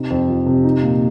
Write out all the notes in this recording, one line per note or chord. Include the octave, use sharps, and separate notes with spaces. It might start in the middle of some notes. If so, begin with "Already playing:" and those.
Already playing: C3 D#4
F2
F3
C3
D#4
A#2